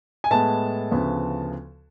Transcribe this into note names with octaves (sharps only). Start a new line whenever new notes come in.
G#5
A2 G#3 B3 A5
D2 C#3 F3 B3